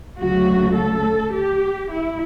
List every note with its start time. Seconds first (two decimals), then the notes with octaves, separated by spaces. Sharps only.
0.18 D2 C#3 F#3 A3 F#4
0.75 A4
1.33 G4
1.90 E4